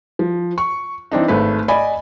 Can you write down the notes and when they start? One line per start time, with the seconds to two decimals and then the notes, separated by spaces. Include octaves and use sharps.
0.19 F3
0.58 C#6
1.12 E3 C4 D4 D#4
1.28 G#1 A3 B4
1.68 D5 D#5 G#5 B5